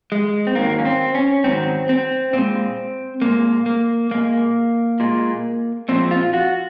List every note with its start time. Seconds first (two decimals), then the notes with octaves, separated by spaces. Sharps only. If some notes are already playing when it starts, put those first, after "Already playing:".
0.12 G#3
0.47 C4
0.55 G#2 D#3 F#3 A#3
0.79 C#4
0.85 C4
1.15 C#4
1.44 G#2 D#3 F#3 C4
1.89 C4
2.33 A#2 G#3 C4
3.22 A#2 G#3 A#3
3.66 A#3
4.11 A#2 G#3 A#3
5.00 A#2 G#3
5.89 A#2 F3 G#3 C4
6.11 F4
6.34 F#4